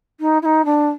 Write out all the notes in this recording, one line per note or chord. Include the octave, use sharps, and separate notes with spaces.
D#4
E4
D#4
D4